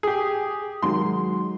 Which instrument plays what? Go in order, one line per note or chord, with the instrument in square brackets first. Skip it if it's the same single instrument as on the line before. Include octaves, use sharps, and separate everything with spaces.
[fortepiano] G4 G#4
[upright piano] D#3 F#3 G#3 [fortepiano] C6